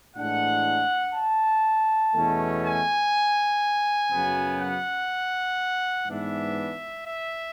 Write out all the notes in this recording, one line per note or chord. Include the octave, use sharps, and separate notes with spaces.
A2 E3 G#3 D4 F#5
A5
E2 B2 A3 C#4
G#5
F#2 C#3 F#3 B3
F#5
G#2 E3 B3 D4 E5
E5